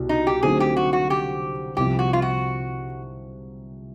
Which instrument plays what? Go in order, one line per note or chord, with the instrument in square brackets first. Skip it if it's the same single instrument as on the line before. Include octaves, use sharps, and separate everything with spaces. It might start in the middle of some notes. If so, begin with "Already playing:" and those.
Already playing: [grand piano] C2 B2
[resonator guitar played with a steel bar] D#4
G4
[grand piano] D3 F#3 A3 C4 D#4 [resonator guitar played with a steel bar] G#4
[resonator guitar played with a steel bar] G4
F#4
F#4
G4
[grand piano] C2 C3 F3 [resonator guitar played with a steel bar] G4
[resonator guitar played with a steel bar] F#4
F4
F#4